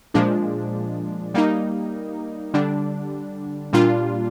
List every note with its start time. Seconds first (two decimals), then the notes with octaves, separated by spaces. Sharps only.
0.14 A#2 F3 G#3 D4
1.34 G3 A#3 D#4
2.54 D3 G3 D4
3.73 A#2 G3 D4 F4